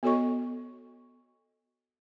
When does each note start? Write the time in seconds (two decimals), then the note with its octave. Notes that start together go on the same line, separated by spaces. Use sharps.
0.03 B3 F#4 A4 C#5 D#5 C#6